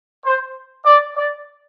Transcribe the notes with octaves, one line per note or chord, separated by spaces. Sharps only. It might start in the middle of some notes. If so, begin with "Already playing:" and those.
C5
D5
D5